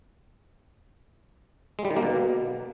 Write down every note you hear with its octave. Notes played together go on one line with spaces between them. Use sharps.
G#3
G3
D#3
A#3
B2